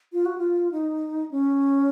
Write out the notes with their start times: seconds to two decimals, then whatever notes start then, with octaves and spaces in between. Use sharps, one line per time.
0.13 F4
0.26 F#4
0.38 F4
0.72 D#4
1.31 C#4